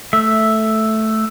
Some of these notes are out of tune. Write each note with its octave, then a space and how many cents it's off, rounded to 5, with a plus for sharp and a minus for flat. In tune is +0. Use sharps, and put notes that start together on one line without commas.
A3 +0 E5 +0